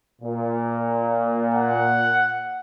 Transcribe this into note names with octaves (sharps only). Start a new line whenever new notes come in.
A#2
F#5